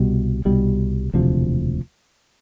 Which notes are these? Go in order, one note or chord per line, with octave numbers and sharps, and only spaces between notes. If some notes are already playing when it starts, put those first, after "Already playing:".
Already playing: C2 B2 G3
C2 B2 G3
E1 D2 C3 F3